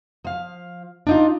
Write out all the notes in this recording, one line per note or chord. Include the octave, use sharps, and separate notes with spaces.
F3 F5
D4 D#4 F4